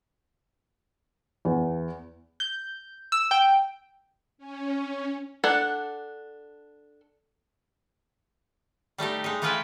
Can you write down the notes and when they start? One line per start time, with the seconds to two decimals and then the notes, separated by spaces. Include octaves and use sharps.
1.45 E2
2.40 G6
3.12 E6
3.31 G5
4.38 C#4
5.44 D4 A4 F#5
8.98 G3 A3 D#4 G4
9.24 G#3 D#4
9.42 E3 A3 E4 F4 B4 G5